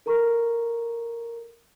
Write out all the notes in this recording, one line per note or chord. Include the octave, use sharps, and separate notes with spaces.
A4 A#4 A#5 C#6